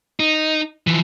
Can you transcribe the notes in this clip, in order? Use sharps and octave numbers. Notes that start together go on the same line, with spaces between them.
D#4
E3 F3